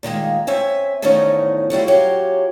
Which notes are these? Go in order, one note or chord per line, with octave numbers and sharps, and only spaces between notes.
A#2 D#3 G#3 A#3
C4 C#4 E5 G#5
E2 A2 D#3 F3 C#4 D#4
F#3 G3 E4 F4
F#2 F#3 C#4 F4 G4